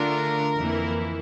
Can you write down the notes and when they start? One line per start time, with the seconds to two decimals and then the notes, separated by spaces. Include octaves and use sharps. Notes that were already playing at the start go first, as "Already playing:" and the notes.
Already playing: D3 A3 D4 F4 A#4
0.56 F2 E3 A#3 E4